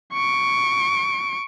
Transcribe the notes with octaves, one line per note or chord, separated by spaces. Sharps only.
C#6 D7